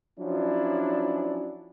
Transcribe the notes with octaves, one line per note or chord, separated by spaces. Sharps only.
F3 F#3 C#4 D4 E4